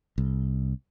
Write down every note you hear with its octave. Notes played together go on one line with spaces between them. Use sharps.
C2